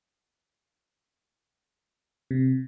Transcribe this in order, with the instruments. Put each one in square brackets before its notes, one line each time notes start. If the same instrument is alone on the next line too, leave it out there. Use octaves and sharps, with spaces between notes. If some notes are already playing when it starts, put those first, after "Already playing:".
[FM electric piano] C3